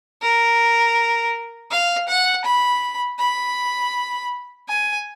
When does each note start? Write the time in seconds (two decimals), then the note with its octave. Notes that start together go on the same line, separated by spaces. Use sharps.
0.22 A#4
1.70 F5
2.08 F#5
2.45 B5
3.19 B5
4.68 G#5